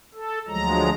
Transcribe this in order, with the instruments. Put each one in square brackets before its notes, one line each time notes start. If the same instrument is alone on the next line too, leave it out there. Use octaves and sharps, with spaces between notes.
[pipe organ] A4
D2 F3 F#3 G#3 A#5